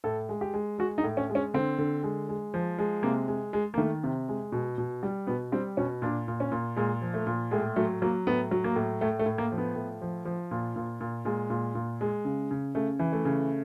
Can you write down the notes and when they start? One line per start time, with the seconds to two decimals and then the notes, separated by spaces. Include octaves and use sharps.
0.04 A2 A4
0.29 G#3
0.41 G4
0.54 G#3
0.79 G#3 F#4
0.98 D#4
1.04 A2
1.17 C#4
1.30 G#3
1.35 C#4
1.54 D3 C4
1.78 D3
2.03 G#3
2.29 G#3
2.54 F3
2.79 G#3
3.03 C3 A#3
3.28 G#3
3.53 G#3
3.74 A#3
3.78 D#3 A3
4.04 C3
4.29 G#3
4.52 B2
4.78 B2
5.03 G3
5.27 B2 B3
5.52 G3 C4
5.77 B2 C#4
6.02 A#2 D4
6.28 A#2
6.40 C#4
6.52 A#2
6.77 A#2 G#3
7.02 F3
7.14 A3
7.27 A#2
7.51 A2 G#3
7.76 F#3 A3
8.02 F#3 A#3
8.27 A2 B3
8.51 F#3
8.64 A#3
8.76 A2
9.01 A2 A3
9.19 A3
9.26 A2
9.38 A#3
9.52 F3
9.58 B3
9.75 A2
10.02 F3
10.25 F3
10.51 A#2
10.76 A#2
11.01 A#2
11.25 A#2 G#3
11.50 A#2
11.75 A#2
12.01 G#3
12.25 C#3
12.51 C#3
12.75 C#3 A3
12.99 E3
13.13 A3
13.25 C#3